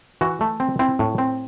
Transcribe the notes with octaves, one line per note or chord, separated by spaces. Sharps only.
E3 F#4
A3
C4
C4 E4
A2
C4